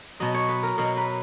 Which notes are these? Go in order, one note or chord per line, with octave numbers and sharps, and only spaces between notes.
B2 F#3 D#5
C#5
B4
A#4
B2 F#3 A#4
B4